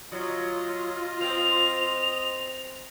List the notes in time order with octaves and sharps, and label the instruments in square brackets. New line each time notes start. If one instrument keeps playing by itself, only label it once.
[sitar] F#3 [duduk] F4 [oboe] D#5
[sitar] C4 [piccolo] F7